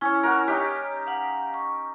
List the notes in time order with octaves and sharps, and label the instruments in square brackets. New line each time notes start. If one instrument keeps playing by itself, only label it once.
[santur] C#4 [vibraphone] E4 C#5
[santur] F#4 A#4
[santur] D#4 G4 [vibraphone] C#5
[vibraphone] F5 F#5
C#6